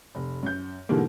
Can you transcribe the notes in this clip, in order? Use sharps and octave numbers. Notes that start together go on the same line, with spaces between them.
F1
F#2 G6
G#2 B2 D3 E3 G3 A#3